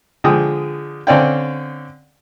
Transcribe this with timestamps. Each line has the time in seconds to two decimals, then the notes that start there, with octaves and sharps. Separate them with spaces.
0.24 D3 F3 G#3 G5 D#6
1.07 D3 C4 C#4 D5 F5 G5